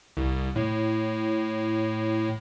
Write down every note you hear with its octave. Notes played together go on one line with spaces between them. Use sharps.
C2
A2